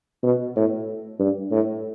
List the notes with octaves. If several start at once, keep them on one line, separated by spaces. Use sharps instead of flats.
B2
A2
G2
A2